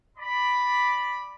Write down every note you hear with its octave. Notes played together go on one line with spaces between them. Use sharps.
D5 B5